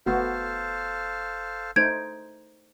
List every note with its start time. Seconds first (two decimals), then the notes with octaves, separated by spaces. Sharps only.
0.06 F#1 A3 B3 F#4 A4 C5 F5
1.76 A3 D#4 C5 G6 G#6 D7